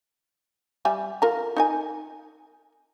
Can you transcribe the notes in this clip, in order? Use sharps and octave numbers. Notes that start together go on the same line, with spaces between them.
G3 E5 G#5
F4 A#4 A#5
D#4 A#4 G#5